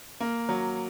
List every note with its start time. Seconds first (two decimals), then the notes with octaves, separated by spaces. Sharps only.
0.20 A#3
0.49 F#3